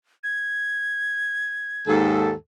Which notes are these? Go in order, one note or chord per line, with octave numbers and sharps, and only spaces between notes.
G#6
D#2 G#2 A4